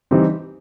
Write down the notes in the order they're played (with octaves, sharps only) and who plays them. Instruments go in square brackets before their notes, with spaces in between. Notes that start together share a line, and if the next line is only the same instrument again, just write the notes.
[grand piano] E3 G3 C4 D#4